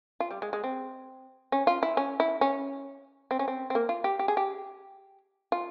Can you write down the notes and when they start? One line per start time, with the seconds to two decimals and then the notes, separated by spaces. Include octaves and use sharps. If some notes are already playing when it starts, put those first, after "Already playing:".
0.20 F4
0.31 G3
0.42 G#3
0.53 G#3
0.64 C4
1.52 C#4
1.67 F4
1.83 E4
1.97 C#4
2.20 E4
2.41 C#4
3.31 C4
3.39 C#4
3.48 C4
3.70 C4
3.75 A#3
3.89 F4
4.04 G4
4.19 G4
4.28 G#4
4.37 G4
5.52 F4